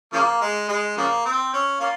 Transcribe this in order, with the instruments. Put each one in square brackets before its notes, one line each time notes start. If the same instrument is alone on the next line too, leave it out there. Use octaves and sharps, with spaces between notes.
[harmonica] C#3 F3 A#3
G#3
G#3
C#3 F3 A#3
C4
C#4
A#3 C#4 F4